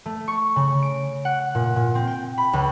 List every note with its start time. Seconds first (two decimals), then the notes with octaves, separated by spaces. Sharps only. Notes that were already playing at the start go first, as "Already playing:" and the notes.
0.06 A3
0.28 C#6
0.56 C#3
0.82 D7
1.25 F#5
1.55 A#2
1.76 A#2
1.95 C4
2.07 G5
2.38 B5
2.53 C#2